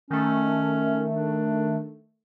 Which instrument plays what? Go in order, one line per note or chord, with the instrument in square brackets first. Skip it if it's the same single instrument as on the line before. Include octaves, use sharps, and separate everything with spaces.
[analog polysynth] D#3 A3 [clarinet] C#4
[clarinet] D4